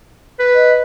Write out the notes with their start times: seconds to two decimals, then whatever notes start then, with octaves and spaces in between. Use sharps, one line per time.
0.39 B4
0.55 D#5